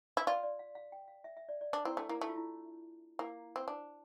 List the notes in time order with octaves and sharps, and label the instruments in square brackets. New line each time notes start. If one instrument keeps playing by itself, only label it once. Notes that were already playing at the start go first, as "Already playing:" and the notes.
[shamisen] E4
[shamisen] F4 [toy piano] D5
[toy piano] D5
F5
F5
G5
F5
E5
E5
D5
D5
[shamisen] D4 [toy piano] A4
[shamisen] C4 [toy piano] E4
[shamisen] A3 [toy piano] D4
[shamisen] A#3 [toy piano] E4
[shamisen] A3 [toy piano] E4
[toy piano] F4
E4
[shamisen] A#3 [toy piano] E4
[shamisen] C4
D4